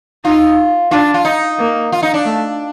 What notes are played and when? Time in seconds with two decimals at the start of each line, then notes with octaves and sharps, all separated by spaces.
0.24 D#4 F4
0.91 D4 F4
1.14 F4
1.25 D#4
1.59 A#3
1.92 F4
2.03 D#4
2.14 D4
2.25 A3